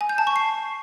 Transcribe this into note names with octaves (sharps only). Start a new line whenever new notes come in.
G#5
G6
A5
C#6
C7